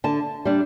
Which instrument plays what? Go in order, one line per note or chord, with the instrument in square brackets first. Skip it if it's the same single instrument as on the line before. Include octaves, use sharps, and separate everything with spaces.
[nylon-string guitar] D3 A5
G3 D4